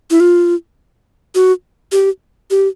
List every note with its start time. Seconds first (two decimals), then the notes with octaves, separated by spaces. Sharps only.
0.10 E4
0.20 F4
1.35 F#4
1.92 G4
2.51 G4